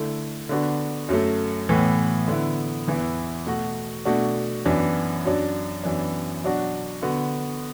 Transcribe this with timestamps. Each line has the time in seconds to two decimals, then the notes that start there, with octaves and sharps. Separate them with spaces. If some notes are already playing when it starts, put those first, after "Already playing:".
Already playing: D3 A3 E4
0.49 D3 B3 D4 F#4
1.09 F#2 F#3 A3
1.69 A2 E3 B3
2.28 D3 B3 E4
2.87 E2 E3 B3 E4
3.46 B2 A3 F#4
4.05 B2 A3 D4 F#4
4.66 F#2 E3 B3 D4
5.25 F#2 F#3 D4
5.84 F#2 E3 B3 D4
6.44 B2 F#3 D4 F#4
7.02 D3 B3 F#4